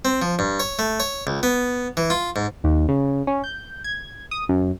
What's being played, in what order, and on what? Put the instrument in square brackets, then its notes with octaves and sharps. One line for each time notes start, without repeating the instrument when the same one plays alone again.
[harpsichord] C4
F3
G2
C#5
A3
C#5
C#2
B3
E3
F4
G#2
[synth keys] D#2
C#3
C#4
G6
G#6
D#6
F#2